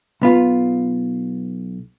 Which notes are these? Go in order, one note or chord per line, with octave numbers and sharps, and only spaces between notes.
B1 B3 F4